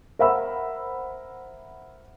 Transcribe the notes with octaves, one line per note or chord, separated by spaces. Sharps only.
A#4 C5 E5 F#5 B5 E6